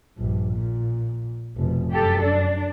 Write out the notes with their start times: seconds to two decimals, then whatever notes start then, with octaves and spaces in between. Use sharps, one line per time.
0.18 A#1 G2
0.54 A#2
1.56 F1 B2
1.92 F#2 G4 A4
2.24 D4